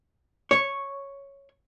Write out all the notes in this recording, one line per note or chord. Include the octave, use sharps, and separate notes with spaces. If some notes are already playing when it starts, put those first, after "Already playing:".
C#5